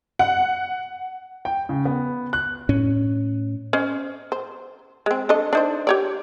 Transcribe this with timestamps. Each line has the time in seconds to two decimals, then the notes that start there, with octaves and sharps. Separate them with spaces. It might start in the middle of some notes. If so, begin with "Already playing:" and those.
0.19 F#5
1.45 G5
1.69 C#3
1.85 B3
2.33 F#6
2.69 A2 C#4
3.73 C#4 C5 D#5
4.32 C5
5.06 G#3 C4
5.29 D4 A4 D#5
5.53 D4 D#4 C5
5.87 G4 C#5 D5